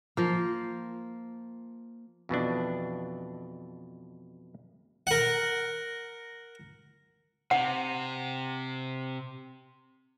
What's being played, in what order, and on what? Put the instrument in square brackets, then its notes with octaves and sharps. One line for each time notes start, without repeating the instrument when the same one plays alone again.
[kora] F3 A#3
[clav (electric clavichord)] F2 B2 E3 D4
[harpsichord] A#4 F#5
[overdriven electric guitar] C3 [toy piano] F#5